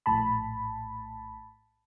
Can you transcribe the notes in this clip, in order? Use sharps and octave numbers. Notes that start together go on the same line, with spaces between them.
A#1 A2 A5 B5